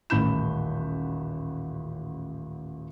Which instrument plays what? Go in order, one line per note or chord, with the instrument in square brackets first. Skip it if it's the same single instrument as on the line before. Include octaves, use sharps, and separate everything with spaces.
[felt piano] D#1 A1 B5 G6 E7